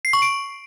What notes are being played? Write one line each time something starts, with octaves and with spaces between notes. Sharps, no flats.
C7
C#6
D7